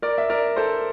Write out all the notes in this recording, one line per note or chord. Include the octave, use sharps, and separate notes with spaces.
A#4 D5
E5
A#4 D5
A4 C5